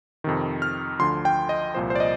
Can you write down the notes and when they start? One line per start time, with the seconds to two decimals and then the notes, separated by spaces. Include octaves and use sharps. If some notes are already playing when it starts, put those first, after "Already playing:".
0.24 F2 C3 D#3
0.62 F6
0.99 D2 D3 F3 C6
1.25 G5
1.49 D#5
1.75 C2 A#2 F3 C5
1.90 C5
1.95 D5
2.00 D#5